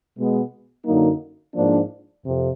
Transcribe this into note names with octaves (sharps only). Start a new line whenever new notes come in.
B2 G#3 B3
F#2 D3 F#3 A#3 D#4
G#2 F3 A#3 D4
F2 C3